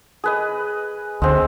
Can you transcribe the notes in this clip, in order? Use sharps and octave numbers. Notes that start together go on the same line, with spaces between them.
G#4 B4 D#5
D2 G#3 C4